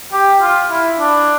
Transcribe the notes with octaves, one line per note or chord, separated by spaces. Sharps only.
G4
F4
E4
D4